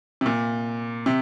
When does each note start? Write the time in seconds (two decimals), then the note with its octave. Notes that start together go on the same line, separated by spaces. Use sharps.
0.21 C3
0.26 A#2
1.06 C3